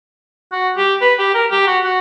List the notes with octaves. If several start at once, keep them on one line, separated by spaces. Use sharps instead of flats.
F#4
G4
B4
G4
A#4
G4
F#4
F#4